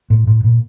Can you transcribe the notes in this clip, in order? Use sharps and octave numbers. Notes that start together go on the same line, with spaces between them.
A2
A2
A#2